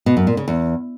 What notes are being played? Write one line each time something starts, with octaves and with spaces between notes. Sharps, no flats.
B2
F#2
A#2
C#3
E2